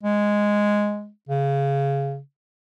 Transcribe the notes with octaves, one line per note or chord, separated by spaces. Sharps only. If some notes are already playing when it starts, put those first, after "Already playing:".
G#3
C#3